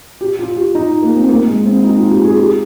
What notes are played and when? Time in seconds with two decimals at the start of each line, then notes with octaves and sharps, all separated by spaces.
0.21 G4
0.39 F4
0.57 G4
0.75 D#4
1.02 A#3
1.16 C4
1.29 A#3
1.48 G#3
1.66 C4
1.84 D#4
1.98 F4
2.11 G4
2.25 G#4
2.39 G4